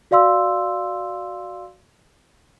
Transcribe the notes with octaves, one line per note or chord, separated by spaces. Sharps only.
F#4 D5 F5 C6 E6